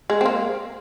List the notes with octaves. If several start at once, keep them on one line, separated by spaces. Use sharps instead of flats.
G#3
C4
A#3